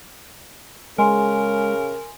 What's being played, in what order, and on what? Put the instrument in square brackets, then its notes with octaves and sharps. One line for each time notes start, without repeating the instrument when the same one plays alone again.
[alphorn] C#3 [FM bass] G#3 [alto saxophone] A#4 [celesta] G#5 C6